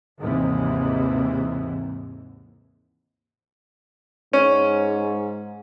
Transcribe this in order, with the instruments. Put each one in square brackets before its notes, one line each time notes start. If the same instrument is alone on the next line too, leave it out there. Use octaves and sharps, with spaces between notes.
[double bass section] D#2 G#2 C3 E3
[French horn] G#2 [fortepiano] C#4